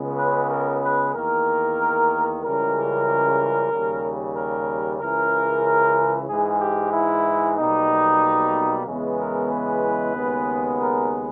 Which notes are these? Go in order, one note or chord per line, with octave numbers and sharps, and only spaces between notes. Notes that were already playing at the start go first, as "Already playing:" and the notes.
Already playing: C#2 C#3 G#3 B3
B4
A#4
B4
E2 D#3 A#3 A#4
C#2 C#3 E3 G3 A#4
D#2 C#3 G3
A#4
C#2 C#3 E3 A#4
G#2 E3 G#3 G#4
G4
E4
B1 B2 G3 A#3 D#4
E2 C#3 E3 G#3 B3
A#4
B4
D#2 C#3 G#3 B3
A#4